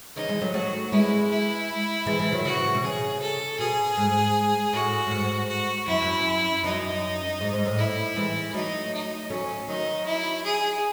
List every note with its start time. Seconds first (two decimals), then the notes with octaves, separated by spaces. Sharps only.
0.16 C#3 E3 D#4
0.29 E3 G#3
0.42 F#3 A3
0.54 F#3 A3 F#4
0.92 G#3 B3 E4
1.30 E4
2.06 E3 G#3
2.19 E3 G#3
2.32 D#3 F#3
2.44 C#3 E3 F#4
2.75 B2
2.83 C#3 G#4
3.21 A4
3.59 B2 G#4
3.97 G#2
4.73 A2 F#4
5.07 A2
5.11 G#2
5.49 F#4
5.88 F#2 E4
6.02 F#2
6.64 F#2 D#4
7.40 G#2
7.53 G#2
7.65 A2
7.78 E4
8.16 E3 G#3
8.54 F#3 A3 D#4
8.93 D#4
9.30 F#3 A3 C#4
9.68 D#3 F#3 D#4
10.06 E4
10.44 G#4